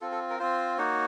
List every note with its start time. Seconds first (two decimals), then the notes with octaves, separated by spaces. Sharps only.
0.01 C4 F4 A4
0.11 A4
0.30 A#4
0.39 C4 F4 C5
0.78 A#3 D#4 F#4 C#5